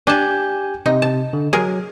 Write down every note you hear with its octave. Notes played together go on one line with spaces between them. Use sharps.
D4 G4 G#5 A5 G6
C3 D#4
A5
D3
F#3 G#4 A#4